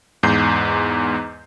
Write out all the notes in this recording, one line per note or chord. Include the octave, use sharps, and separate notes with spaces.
E2 G#2 G6 C7